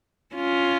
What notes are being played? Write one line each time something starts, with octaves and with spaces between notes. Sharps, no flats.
C#4 F4